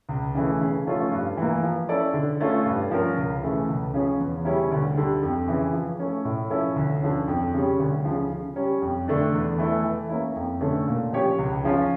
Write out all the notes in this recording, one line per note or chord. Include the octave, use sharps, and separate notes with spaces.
C#2
C#3 E3 A3
C#3
F3 A3 C#4 F4
G2
E3 A#3
F3
C#4 E4 A4 D5
D3
A3 C#4 F4
G2
F3 C#4 F4 A#4
C#2
C#3 E3 A3
C#2
C#3 F3 C#4
E2
C#3 G3 C#4 E4
D2
D3 G3
F2
C#3 E3
F3
A3 C#4
A2
F3 C#4 E4 A4
D2
D3 F3 C#4
F2
C#3 G3 C#4
D2
C#3 F3
C#3
G3 C#4
F2
D3 A3 D4
E2
E3 A3 E4
E3
A#3 C#4 E4
F2
D3 A3 C#4
A#2
F3 C#4 G4 C#5
C#2
C#3 F3 C#4 F4